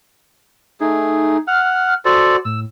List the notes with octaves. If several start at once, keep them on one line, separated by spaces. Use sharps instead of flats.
A3 D#4 G#4
F#5 F6
F#4 A4 C5 D5
A2 E6